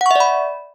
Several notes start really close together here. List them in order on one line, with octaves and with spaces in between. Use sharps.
F#5 C#6 E5 D5 B5